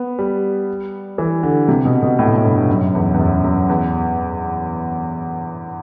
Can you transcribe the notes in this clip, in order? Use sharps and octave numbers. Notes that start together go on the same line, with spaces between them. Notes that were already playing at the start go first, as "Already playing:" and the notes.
Already playing: B3
G3
E3
D3
C3
B2
B2
A2
B2
A2
G2
F#2
E2
E2
F#2
F#2
E2